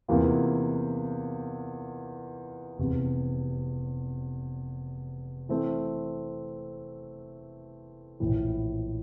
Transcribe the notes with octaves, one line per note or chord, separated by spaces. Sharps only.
E2 C3 E3 A#3 F4
F1 E2 C3
E3 A3 C4
A#1 A2 E3